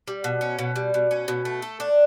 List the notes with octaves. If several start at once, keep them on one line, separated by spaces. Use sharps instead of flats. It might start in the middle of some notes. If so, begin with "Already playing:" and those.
G3
B2
C#4
B2
G3
B2
C#4
B2
A3
A4
D4